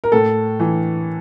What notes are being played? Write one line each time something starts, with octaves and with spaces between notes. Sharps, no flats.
A#4
A2 A4
E3